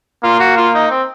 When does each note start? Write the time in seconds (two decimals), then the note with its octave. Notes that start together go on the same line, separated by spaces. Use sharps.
0.23 A#3 F4
0.40 F#4
0.57 F4
0.75 D#4
0.90 C4